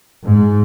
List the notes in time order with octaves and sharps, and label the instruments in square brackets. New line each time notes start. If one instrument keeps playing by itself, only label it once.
[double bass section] G#2